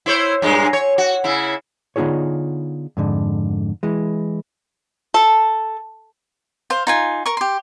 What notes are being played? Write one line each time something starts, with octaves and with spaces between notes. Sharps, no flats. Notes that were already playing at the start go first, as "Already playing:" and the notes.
E4 C5 C#5
G2 A#2 G#3
C#5
F#4
C#3 E4
D3 B3 D#4 F4 G#4 C#5
F2 G#2 D3
E3 G#3
A4
C5 F5
D#4 F4 G#5
A#4 C#6
G4 C6